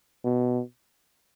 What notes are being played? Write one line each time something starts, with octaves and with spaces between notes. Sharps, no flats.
B2